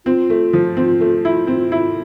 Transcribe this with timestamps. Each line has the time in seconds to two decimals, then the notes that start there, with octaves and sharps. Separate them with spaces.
0.06 C4 F4
0.30 A3
0.53 F3
0.77 C4
1.00 A3
1.25 E4
1.47 C4
1.72 E4